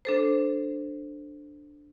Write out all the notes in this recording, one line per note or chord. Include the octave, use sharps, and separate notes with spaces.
D4 A4 C5